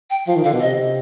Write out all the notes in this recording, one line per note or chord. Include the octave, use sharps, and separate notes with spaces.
G5
F3 F5
D#3
D3 F5
B2
C3 D#5